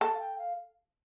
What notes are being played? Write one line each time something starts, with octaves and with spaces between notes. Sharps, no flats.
A4 A5
F5
G5
F5